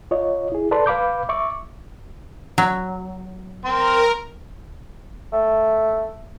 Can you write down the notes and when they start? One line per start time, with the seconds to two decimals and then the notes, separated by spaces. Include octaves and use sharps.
0.11 F4 C#5 D#5
0.52 E4 G#4
0.71 A4 B4 D5 A5 C6
0.86 B4 F5 B5 D6 G6
1.29 E5 C#6 D6
2.58 F#3
3.65 C4 A#4 C6
5.33 A3